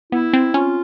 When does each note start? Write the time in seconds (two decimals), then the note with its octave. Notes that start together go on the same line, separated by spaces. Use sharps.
0.12 B3 E4
0.33 C4
0.54 C#4 F4